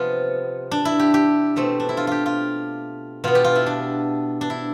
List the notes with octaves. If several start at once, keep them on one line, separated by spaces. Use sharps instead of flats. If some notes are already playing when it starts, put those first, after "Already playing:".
Already playing: C3 F3 B3 F4
D4
E4
G4
G4
B2 A3 C4
D4
E4
F4
F4 G4
F4
B2 B3 F4
G4
F4
E4
D4
D4
E4